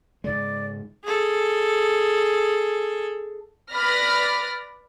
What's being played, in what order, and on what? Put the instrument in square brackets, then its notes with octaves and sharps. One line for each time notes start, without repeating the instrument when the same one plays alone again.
[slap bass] G#2 C#3 G#3 [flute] D5
[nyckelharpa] G#4 A4
[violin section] B4 D5 B5 F6 A#6